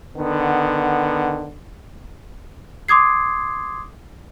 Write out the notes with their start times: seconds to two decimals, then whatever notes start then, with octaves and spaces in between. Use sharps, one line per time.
0.16 D3 D#3 B3
2.88 C6 D6 D#6 G#6 C7